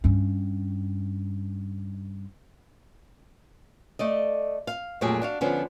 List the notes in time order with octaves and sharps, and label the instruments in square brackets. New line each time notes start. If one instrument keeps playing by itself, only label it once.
[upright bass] G2 C#4
[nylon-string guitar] A3 D5 D#5
F5
F2 A#2 F#3 A3 G4 G#4
D4 F#4 F5
D3 F3 B3 C#4